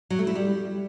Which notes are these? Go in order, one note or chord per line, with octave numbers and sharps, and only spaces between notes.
F#3
A3
E4
G3